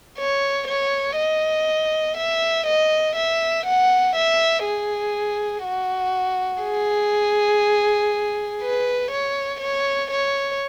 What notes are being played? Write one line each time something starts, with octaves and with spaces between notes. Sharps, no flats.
C#5
C#5
D#5
E5
D#5
E5
F#5
E5
G#4
F#4
G#4
B4
C#5
C#5
C#5